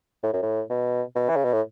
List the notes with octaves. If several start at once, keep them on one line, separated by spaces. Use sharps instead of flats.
A2
F#2
A2
B2
B2
E3
C#3
B2
A2